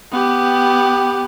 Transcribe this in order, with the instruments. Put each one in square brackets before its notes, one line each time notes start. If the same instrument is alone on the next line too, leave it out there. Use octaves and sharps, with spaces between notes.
[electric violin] B3 G4